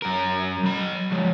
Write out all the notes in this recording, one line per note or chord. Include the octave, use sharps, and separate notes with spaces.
F#2 A#4
F#3 B5
F3 G#3